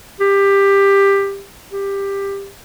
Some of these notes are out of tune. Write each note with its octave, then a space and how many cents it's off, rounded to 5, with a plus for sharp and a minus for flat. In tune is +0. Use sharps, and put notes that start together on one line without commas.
G4 +15
G4 +15